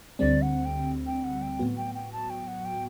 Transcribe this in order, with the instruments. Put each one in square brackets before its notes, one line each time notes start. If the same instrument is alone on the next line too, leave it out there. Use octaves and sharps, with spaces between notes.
[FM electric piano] D2 D3 G3 C4 [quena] D5
[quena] F#5
G5
G5
F#5
G5
[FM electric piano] A2 F#3 B3 F#4
[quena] G5
G5
A5
G5
F#5
G5